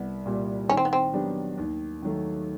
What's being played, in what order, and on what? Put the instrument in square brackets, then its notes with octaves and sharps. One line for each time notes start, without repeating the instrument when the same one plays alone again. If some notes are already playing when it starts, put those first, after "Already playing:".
Already playing: [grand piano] C2 [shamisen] B3
[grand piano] A#2 G3
[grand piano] D#3 [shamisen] C#4
[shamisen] C4
B3
C4
[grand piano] F#3 B3 D4 G4
D#2
D#3 F#3 A3